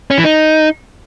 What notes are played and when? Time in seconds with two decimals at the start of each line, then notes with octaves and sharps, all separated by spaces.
0.11 C#4
0.18 E3
0.25 D#4